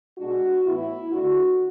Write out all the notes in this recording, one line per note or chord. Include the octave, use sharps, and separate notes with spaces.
B2 G#3 D4 F#4
A2 E3 B3 E4
D3 A3 D4 F#4